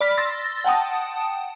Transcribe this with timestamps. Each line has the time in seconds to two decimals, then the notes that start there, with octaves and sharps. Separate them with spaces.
0.01 D5 B5 F6 B6
0.17 C6 E6 A6 A#6
0.64 F#5 G5 A5 D#6